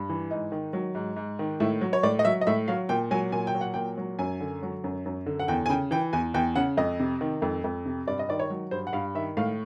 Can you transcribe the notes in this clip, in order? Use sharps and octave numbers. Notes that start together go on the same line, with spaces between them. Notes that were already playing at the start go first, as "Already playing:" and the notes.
Already playing: G2
E3
G#2 D#4
D#3
F#3
G#2
G#2
D#3
A2 E4
F#3
C#5
A2 D5
D#5
F#3 E5
D#5
A2 E5
F#3 F5
A#2 G5
F#3 G#5
A#2 G#5
G5
F#3
F#5
A#2 G5
F#3
F#2 G#5
D3
F#3
F#2
F#2
D3
F#5
E2 G5
G#5
C#3 G5
E3 G5
E2 G#5
E2 G5
C#3 F#5
F2 D#5
C3
D#3
F2
F2
C3
G2 D5
D#5
D#3 D5
C#5
F#3
G2 C5
F#5
G2 F5
D#3 E5
A2 F5